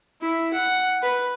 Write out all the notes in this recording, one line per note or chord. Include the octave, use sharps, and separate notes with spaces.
E4
F#5
B4